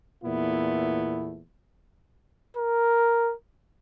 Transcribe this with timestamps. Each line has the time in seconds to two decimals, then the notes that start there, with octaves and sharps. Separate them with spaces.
0.24 E2 A#2 A3 B3 E4
2.57 A#4